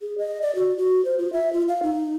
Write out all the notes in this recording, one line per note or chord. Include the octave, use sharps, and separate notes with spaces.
G#4
D#5
D5
F#4
F#4
C5
F4
E5
F4
F5
D#4